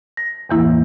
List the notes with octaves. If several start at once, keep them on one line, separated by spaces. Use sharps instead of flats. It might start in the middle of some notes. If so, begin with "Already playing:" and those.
A#6
E2 A2 E3 A#3 E4